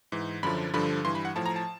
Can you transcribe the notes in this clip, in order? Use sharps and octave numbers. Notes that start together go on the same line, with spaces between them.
G#2 E3
F#2 D3 F3 B5
G2 D3 F3 B5
G2 E3 C6
B5
F#5
A2 F3 A5
A#5
A5